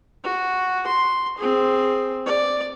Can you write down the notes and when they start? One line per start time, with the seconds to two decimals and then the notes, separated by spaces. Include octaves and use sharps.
0.24 F#4
0.87 C6
1.38 C4 G#4
2.26 D5